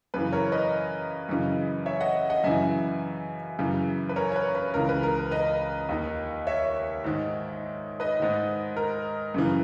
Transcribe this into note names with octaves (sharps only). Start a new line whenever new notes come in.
F#2 C#3 E3 B4
A#4 C#5
B4 D#5
F#2 C#3 E3
C#5 E5
D#5 F#5
D#5 F#5
F#2 C#3 E3 E5 G#5
F#2 C#3 E3
B4
A#4 C#5
C#5
B4
B4
C#2 C#3 E3 A#4
B4
A#4
B4
B4 D#5
D#2 D#3
C#5 E5
G#2 D#3
B4 D#5
G#2 D#3
A#4
F#2 C#3 E3